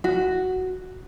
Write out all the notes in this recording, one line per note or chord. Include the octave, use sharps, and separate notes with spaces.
F#4